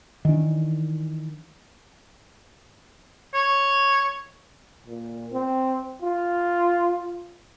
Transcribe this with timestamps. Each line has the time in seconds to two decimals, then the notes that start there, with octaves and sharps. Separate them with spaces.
0.25 D#3 E3 D4
3.34 C#5
4.86 A#2
5.32 C4
6.02 F4